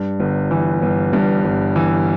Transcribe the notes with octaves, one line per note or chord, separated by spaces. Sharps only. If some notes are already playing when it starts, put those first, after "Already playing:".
Already playing: G2
G1
E3
G1
G2
G1
E3